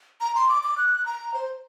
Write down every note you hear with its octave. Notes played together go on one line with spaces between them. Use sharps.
A#5
C6
D6
D6
F#6
A#5
C5